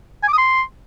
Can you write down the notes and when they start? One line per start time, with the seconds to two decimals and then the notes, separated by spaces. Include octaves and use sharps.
0.23 G#5
0.28 D6
0.33 D#6
0.38 C6